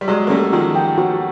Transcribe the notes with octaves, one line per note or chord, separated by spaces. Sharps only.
G3
F#3 G#3 D5
A#3
G3 A3 C#4
D#3 F3 F#4
G5
F#4